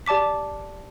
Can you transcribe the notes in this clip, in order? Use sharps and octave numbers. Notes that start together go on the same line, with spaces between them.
G4 D5 A5 D6 B6